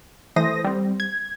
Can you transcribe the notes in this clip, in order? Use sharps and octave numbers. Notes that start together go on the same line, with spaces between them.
E3 A3 C5 D#6 A#6
G3 C4
G#6